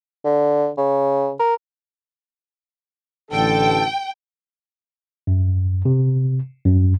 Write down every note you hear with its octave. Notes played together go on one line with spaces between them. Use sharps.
D3
C#3
A#4
A1 D3 A4 G5
F#2
C3
F#2